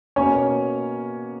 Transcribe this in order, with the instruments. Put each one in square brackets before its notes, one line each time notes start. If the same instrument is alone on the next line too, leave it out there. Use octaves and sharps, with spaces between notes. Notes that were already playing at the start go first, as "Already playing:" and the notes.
[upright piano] B2 A#3 C#4 C#5